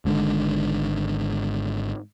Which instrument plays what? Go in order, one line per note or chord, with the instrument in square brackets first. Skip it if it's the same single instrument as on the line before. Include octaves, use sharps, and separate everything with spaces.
[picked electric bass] G#1 G#2 D3